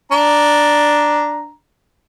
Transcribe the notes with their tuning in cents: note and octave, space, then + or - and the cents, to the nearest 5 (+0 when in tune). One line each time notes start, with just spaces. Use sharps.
D4 +0 A#5 +0